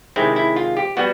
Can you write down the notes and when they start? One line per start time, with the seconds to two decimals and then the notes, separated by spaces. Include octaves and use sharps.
0.16 C3 D#3 G#3 C4 E4
0.36 E4
0.56 F4
0.77 G4
0.97 G3 B3 F#4